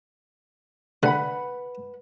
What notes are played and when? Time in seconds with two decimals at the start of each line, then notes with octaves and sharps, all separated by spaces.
1.03 D3 B4 F#5 B5